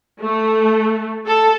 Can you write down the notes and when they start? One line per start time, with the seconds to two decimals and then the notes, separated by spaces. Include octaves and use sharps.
0.21 A3
1.26 A4